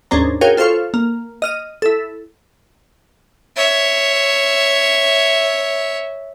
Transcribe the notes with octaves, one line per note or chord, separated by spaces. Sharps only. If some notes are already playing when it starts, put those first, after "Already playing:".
D#2 G#2 C#4 D4 C5 A#5
F#4 G#4 A#4 C#5 F5 G5
F4 A4 C5 F5 C#6 F6
A#3
D#5 F6 D#7
E4 A4
C#5 E5